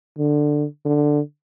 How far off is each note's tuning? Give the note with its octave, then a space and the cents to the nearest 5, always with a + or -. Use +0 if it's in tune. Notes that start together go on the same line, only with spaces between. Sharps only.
D3 +10
D3 +5